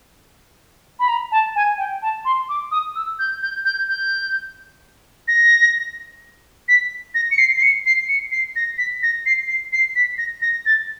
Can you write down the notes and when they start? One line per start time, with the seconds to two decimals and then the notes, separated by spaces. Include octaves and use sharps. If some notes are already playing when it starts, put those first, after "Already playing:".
0.99 B5
1.08 A#5
1.32 A5
1.56 G#5
1.78 G5
2.02 A5
2.25 C6
2.49 D6
2.71 D#6
2.95 E6
3.19 G6
3.42 G6
3.65 G6
3.89 G6
5.28 A#6
6.68 B6
7.15 A#6
7.31 C#7
7.38 C7
7.57 C7
7.62 C#7
7.86 C7
8.09 C#7
8.32 C7
8.56 A#6
8.78 B6
9.03 A#6
9.26 C7
9.48 C7
9.73 C7
9.96 B6
10.18 A#6
10.42 A#6
10.66 A6